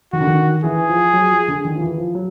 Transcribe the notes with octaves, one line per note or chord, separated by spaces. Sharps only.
D#3 F#4
D3
D#3
E3 G#4
F3
F#3
F3
D3
D#3
F3
E3
F3
F#3